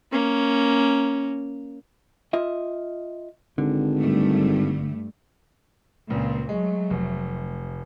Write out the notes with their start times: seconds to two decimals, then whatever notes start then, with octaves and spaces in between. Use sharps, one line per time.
0.12 A#3 C#4
2.33 F4 D#5 E5
3.58 G#1 D3
3.98 G2 A3
6.10 C#2 A#2 C4
6.49 F#3 G#3 A3
6.90 F1